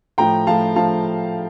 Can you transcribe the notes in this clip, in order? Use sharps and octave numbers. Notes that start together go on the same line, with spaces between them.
A2 F3 G5 A#5
A2 F3 F5 A5
A2 F3 F5 A5